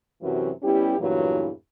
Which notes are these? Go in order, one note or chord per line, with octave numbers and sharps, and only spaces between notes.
F#2 C3 E3 F#3
G3 B3 C#4 E4 G4
E2 G2 A#2 E3 F#3